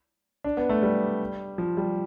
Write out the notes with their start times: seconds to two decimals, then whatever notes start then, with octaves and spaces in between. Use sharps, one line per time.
0.44 D4
0.57 B3
0.69 A3
0.83 G3
1.58 F3
1.77 G3